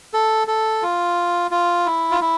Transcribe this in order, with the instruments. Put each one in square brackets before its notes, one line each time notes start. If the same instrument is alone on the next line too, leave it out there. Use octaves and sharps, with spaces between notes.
[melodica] A4
A4
F4
F4
E4
F4
E4